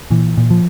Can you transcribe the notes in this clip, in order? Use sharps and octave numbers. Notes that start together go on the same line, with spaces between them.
A#2 E3
A#2
F3